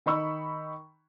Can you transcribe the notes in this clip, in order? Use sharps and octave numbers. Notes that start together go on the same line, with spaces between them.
D#3 D#4 B5 C#6 E6